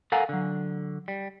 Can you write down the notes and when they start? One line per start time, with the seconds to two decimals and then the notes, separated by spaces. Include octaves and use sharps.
0.12 A4 A#4 F5 F#5 G#5 A#5
0.29 D3 F#3
1.08 G3